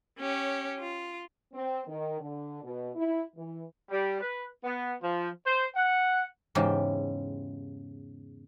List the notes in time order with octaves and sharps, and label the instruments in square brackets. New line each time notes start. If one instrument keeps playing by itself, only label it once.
[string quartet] C#4 G4 C#5
F4
[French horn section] C4
D#3
D3
B2
E4
E3
[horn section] G3
B4
B3
F3
C5
F#5
[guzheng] E2 G#2 C#3 G4